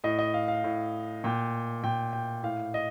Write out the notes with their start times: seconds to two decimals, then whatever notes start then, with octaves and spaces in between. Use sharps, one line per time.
0.04 A2 D#5
0.19 D#5
0.34 F5
0.48 F5
0.64 A2
1.24 A#2 G5
1.83 A#2 G5
2.13 G5
2.43 A2 F5
2.74 D#5